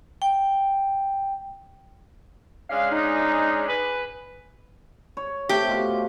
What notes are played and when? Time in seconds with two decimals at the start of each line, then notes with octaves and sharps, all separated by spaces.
0.22 G5
2.70 G#3 C#4 D4 F5
2.92 D#4
3.68 G#4 B4
5.17 C#5
5.49 C3 A3 G4
5.68 B2 F4